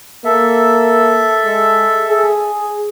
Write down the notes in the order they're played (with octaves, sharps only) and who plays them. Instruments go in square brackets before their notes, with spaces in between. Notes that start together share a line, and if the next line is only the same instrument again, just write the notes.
[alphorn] A#3 [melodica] A4 E5
[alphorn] G#3
G#4